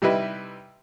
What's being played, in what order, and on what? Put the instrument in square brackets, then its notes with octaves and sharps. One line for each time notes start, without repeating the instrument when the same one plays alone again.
[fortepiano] C3 G3 D#4 E4 B4 E5